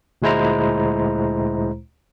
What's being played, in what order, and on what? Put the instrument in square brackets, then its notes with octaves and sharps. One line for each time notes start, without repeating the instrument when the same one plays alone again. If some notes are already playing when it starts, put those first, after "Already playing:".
[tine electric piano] D2 A#2 G#3 E4 C5 A#5